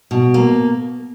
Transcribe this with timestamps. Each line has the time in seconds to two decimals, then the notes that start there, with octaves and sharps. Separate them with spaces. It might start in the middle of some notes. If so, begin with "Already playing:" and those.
0.11 B2
0.34 A#3